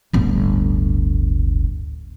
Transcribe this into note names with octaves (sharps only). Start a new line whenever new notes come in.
D1 G1